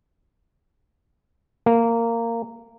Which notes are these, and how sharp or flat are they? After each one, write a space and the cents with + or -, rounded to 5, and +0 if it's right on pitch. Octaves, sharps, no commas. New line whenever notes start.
A#3 -15